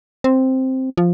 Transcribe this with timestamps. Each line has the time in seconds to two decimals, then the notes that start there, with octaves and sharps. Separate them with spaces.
0.24 C4
0.98 F3